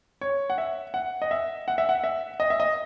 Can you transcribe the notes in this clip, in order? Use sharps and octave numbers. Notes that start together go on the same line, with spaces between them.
C#5
F#5
E5
F#5
D#5
E5
F#5
E5
F#5
E5
D#5
E5
D#5